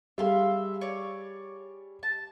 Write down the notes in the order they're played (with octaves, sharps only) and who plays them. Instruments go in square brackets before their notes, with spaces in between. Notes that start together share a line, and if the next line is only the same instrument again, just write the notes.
[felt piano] G3 G#4 [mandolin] E5 F5 C6
[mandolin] C#5 D5
A5